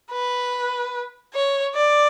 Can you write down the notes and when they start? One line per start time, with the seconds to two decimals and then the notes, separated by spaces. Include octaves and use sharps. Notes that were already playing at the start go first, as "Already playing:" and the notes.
0.12 B4
1.35 C#5
1.75 D5